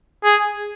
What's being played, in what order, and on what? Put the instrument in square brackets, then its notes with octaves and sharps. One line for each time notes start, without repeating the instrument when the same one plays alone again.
[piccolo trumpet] G#4